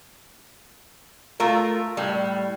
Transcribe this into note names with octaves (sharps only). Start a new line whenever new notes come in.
A3 F4 A#4
A2 G3